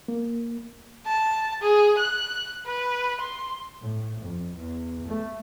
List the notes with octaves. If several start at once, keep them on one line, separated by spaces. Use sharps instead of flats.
A#3
A5
G#4
F#6
B4
C6
A2
F2
E2
A3